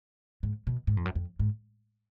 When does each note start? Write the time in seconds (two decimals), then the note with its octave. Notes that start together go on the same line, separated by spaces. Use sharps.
0.43 G#2
0.67 B2
0.87 G#2
0.97 F2
1.05 F#2
1.15 F2
1.39 G#2